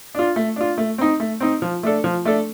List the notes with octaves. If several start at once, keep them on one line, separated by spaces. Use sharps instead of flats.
D4 F4
A3
D4 F4
A3
C4 D#4
A3
C4 D#4
F3
A3 D4 A4
F3
A3 D4 A4